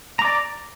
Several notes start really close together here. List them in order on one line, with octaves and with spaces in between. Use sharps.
A#5 D6 D5